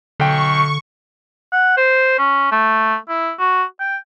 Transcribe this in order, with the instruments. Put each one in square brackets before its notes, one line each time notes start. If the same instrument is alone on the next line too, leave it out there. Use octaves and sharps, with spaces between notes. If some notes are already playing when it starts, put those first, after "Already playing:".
[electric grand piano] B1 G5 [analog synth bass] D3 [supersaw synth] C#6
[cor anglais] F#5
C5
C#4
A3
E4
F#4
G5